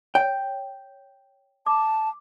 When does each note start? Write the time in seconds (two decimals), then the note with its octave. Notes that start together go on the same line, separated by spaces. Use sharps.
0.15 C#5 G5
1.66 A5 D6